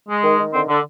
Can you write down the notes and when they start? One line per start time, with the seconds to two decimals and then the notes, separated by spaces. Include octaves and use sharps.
0.09 G#3
0.23 D#3
0.39 D#3
0.53 D3 C4 C5
0.68 D3